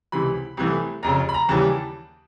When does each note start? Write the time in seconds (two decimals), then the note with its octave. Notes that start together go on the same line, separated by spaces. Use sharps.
0.12 C#2 C3 E3 B5
0.57 C2 C3 E3 A3
1.03 F1 F2 C#3 A#5
1.29 B5
1.34 A#5
1.49 D#2 C#3 E3 G3 A5